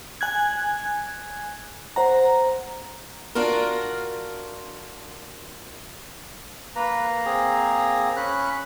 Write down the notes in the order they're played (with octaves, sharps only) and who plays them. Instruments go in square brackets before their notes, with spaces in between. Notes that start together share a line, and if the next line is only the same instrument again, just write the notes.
[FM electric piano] G#5 F#6 G#6
C5 F#5 A#5
[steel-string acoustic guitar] D4 F4 F#4 A#4
[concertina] A#3 A#5 [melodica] B4
[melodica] C4 G#4
[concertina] C#4 B5 F#6